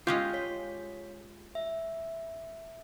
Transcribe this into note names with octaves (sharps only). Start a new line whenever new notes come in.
G#3 C#4 F4 G4 G6
C#5 B6
E5